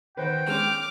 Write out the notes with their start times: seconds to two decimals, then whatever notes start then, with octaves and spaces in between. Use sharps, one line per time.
0.17 D#3 B4 C5 F#5 G5
0.47 G#3 C#4 D6 F6